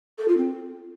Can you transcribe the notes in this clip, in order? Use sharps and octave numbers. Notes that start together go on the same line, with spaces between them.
A4
F4
C4